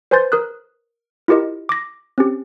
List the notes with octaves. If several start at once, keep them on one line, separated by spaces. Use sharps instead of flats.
B4 C5 G#5 C6 G6 A6
A#4 D#6 F#6
E4 F4 G4 A#4 D#5
D6 A#6
C4 C#4 G4